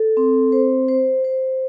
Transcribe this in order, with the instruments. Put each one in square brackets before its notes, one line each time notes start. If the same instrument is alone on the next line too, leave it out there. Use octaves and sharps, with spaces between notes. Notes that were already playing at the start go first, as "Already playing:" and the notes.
Already playing: [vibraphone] A4
C4
C5
C5
C5